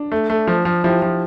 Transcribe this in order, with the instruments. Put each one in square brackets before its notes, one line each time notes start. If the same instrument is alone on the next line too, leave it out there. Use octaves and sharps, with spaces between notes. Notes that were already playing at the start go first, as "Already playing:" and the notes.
Already playing: [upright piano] D4
[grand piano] A3
A3
F3
F3
[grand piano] F3 [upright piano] E4 G4
[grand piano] F3